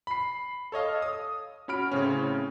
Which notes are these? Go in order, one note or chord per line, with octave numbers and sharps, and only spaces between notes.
B5 C7
A4 C#5 D#5 F5
D#6
C#4 F#4 B5 F6 D7
A2 C#3 C4 C#4